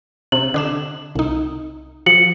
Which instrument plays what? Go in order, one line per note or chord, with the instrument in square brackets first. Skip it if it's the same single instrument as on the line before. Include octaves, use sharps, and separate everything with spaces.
[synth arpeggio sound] C3 [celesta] F#7
[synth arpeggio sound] D3 D4 E7
C2 D#4
[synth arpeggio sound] F3 [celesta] C#7 F#7